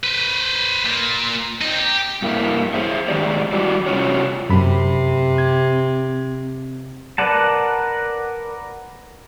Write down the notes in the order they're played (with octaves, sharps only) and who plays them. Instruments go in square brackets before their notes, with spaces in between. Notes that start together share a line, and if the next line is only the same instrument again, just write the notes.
[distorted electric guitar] B4 C5
A#2
C4 D#4
G4
[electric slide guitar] G2 A#3 E4
G#4 C5 E5
G#2 B2 D#3 G4 D5
G3 E4 F#4 D5
C3 C#4 F4 F#4 C#5
[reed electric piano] F#2 B5 [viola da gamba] C3 [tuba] C4
[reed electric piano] G#6
[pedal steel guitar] A#4 B4 D5 F#5 A5